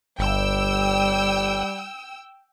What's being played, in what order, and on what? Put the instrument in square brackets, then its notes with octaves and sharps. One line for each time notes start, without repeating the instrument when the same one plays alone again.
[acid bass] G1 [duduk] G3 [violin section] G5 E6